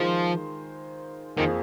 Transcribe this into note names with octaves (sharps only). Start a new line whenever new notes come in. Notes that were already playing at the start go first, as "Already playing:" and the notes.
Already playing: D#3 F3 G#3 F4 C5
F2 D#3 F3 A#3 G#4 C5